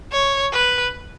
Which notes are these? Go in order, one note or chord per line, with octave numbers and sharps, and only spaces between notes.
C#5
B4